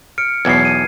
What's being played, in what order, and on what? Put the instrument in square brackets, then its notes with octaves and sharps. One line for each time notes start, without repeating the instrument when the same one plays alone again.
[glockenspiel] F6 C#7 D7
[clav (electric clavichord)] B1 E2 B2 [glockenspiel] G#6 C7
[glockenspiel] D#7